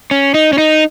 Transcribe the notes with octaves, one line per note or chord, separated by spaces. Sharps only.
C#4
D#4
C#4
D#4